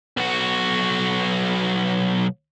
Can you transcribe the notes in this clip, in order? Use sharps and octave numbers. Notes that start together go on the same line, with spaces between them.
B1 F#4